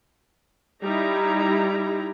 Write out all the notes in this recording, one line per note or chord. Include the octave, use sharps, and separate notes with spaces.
G3 D#4 E4 A#5